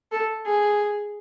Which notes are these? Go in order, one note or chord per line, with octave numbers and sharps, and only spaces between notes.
A4
G#4